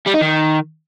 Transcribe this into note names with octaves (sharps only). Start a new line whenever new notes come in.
G3
D#4
D#3